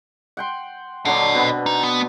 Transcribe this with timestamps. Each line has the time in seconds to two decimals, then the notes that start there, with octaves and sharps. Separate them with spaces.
0.37 F#5 G5 C6
1.05 D3 F#3 D4 D#5 F#5
1.35 B2 B3 C4
1.66 D#4
1.84 B3